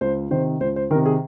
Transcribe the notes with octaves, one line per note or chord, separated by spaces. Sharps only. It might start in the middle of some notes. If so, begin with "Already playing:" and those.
C#2 C5
C3 D#3 C5
C#2 C5
C5
C3 D#3 A#4
G#4